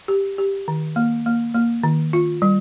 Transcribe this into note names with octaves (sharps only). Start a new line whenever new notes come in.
G4
G4
D#3
A#3
A#3
A#3
D#3
F4
G3